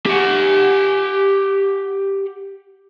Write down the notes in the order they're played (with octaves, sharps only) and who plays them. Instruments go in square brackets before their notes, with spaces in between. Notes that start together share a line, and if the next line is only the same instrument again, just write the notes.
[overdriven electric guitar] G4 F#5